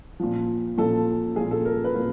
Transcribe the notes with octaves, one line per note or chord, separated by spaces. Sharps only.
A#2 F3
A#2 F3 A4
A#2 F3 G#4
A4
A#4
B4
A#2 F3 A#4